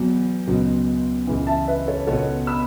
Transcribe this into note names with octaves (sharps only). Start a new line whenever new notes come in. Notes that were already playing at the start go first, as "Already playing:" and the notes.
Already playing: E2 B2 F#3 B3
C#2 B2 F#3
C#2 C#3 E3
E5 A5
B4 E5
A4 C#5
C#2 B2 B3 A4 C#5
B5 E6